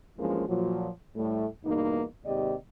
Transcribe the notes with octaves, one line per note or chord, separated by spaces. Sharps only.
G2 E3 F3 G#3 A#3 C#4
A#2 F3 F#3
A2 G3 A3
E2 G2 B2 A#3 D#4
D#2 G#2 C3 G4 D5 D#5